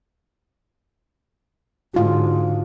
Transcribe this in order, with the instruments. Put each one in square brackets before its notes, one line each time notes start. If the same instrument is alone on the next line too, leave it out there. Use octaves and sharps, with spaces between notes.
[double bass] G#2 D3 [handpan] F4 F#4